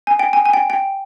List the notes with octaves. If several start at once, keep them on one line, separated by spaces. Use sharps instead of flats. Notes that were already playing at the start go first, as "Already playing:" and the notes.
G#5
G5
G#5
G#5
G5
G5